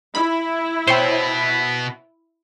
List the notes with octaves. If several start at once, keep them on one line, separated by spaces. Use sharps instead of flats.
E4 B5
B2 B3 C5 C#5 G5